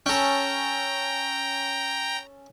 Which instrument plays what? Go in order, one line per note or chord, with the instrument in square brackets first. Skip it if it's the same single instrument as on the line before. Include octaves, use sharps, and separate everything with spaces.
[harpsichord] C#4 A4 [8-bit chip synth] G5 A#5